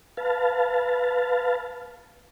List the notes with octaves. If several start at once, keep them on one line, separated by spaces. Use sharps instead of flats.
B4 F5 A5